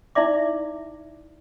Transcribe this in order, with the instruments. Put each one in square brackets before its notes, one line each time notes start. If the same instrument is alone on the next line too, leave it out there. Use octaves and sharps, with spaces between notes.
[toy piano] D#4 E4 D5 E5 D6